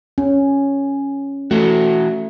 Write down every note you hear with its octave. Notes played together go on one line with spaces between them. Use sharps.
C#4
E3 A3 F#4